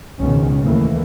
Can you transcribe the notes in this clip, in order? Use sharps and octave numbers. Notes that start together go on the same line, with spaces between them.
G#1 C#2 G#2 B2 D#3 C#4
D#2 E3 A3 A#3